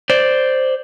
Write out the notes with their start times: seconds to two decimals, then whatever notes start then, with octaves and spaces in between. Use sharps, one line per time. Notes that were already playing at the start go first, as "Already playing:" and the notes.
0.10 C5 D5